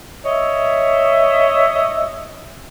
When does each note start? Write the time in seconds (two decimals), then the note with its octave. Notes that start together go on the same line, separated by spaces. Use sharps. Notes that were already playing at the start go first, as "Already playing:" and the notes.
0.25 C#5 D#5 E5